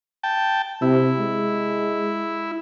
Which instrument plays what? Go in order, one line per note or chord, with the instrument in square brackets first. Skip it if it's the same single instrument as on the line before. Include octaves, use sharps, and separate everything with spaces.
[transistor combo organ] G5 A5
[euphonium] C3 [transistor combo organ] E4
[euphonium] G#3